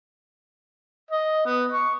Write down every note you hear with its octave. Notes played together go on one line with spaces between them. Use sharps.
D#5
B3
C#6